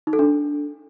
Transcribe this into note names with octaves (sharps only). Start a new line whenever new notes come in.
D#4
A4
D4